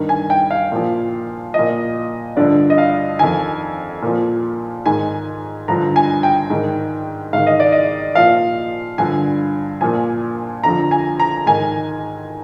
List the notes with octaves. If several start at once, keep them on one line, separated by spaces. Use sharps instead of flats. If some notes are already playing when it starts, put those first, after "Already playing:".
Already playing: G2 D#3
G#5
G5
F5
A#2 F3
A#2 F3 D#5
G2 D3 F3 D5
D#5
F5
F2 D#3 G#5
A#2 F3
G#2 D#3 G#5
G2 D3 F3 A#5
G#5
G5
G#2 D#3
G#2 D#3 F5
D#5
D5
D#5
A#2 F3 F5
G2 D3 F3 G#5
A#2 F3 G#5
F2 D3 F3 A#5
G#5
A#5
G#2 D#3 G#5